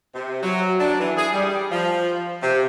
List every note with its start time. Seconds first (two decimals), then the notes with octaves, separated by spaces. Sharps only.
0.15 C3
0.43 F#3
0.80 D4
0.99 E3
1.17 G#4
1.33 G3
1.71 F3
2.43 C3